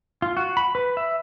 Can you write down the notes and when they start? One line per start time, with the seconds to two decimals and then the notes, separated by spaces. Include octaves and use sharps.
0.22 F4
0.37 F#4
0.57 B5
0.75 B4
0.97 E5